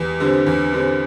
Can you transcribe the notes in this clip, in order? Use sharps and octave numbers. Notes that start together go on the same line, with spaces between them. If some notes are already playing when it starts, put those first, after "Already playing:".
Already playing: E2 G4
D3 G3 C4
E2
D3 G3 C4